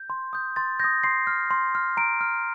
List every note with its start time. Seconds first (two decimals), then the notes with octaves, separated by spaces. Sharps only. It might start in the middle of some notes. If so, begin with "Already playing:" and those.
Already playing: G6
0.10 C6
0.33 D#6 G6
0.56 C6 A6
0.80 D#6 G6 A#6
1.04 C6 C7
1.27 F6
1.51 C6
1.75 F6
1.97 A#5 D7
2.21 F6